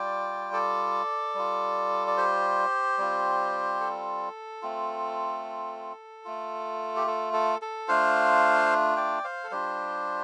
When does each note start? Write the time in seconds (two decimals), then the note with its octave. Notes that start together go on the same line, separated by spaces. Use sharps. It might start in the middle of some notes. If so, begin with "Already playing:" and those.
Already playing: G3 F4 D5 G5
0.53 A4 D5
1.35 G3 F4
2.07 D5
2.17 G4 C5
2.98 G3 C4 F4
3.81 A4
4.62 A3 C4 F4
6.25 A3 F4
6.96 G4
7.07 A4
7.34 A4
7.62 A4
7.88 A3 D4 F4 C5 F5
8.97 D5 G5
9.24 C5 F5
9.44 A4
9.51 G3 D4 F4 G4 C5